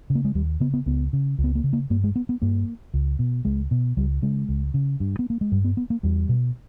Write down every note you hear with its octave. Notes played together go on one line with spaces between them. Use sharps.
C#3
A#3
G#3
D#2 G3
C#3 B3
B3
C#2 B3
C#3
C#2
B3
A#3
C#3
A#3
G2 A#3
G#3
B3
B3
G2 A#3
C#2
B2
C#2 G#3
B2
C#2 G3
C#3 G#3
C#2
C#3
G2
B3
A#3
G#3
G2 G3
B3
B3
A#3
E2 G3
B2